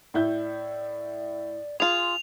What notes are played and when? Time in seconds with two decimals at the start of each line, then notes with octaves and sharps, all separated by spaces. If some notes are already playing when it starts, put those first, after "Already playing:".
0.14 A2 E4 D5 G6
1.80 F4 G#4 C6 F7